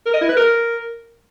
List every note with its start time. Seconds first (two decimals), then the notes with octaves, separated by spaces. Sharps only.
0.06 A#4
0.14 D#5
0.21 E4
0.29 B4
0.37 A#4